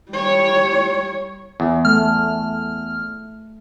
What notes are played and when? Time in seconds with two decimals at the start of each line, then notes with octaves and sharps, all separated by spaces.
0.11 G3 C#5
1.60 E2
1.85 A3 F6